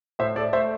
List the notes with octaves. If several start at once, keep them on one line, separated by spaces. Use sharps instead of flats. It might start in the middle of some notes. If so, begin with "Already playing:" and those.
A2 C5 E5
A4 D5
A3 C5 E5